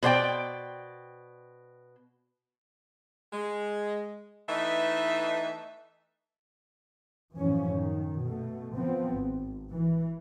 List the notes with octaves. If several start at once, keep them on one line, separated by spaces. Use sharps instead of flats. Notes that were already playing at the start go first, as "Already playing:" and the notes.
B2 C5 D5 G5
G#3
E3 A3 B3 D#4 D#5 E5
F#2 A2 E3 F3 C#4
D#3
B2 A3
F3 B3 C4
G#1
E3